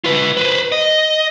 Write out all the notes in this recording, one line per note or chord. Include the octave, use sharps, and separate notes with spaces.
F4 B4
B4 C5
D#5